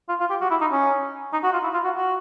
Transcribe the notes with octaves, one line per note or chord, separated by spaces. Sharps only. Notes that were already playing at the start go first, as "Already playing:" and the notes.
F4
F4
G4
F#4
E4
D#4
C#4
D#4
F#4
F4
E4
F4
F#4
F#4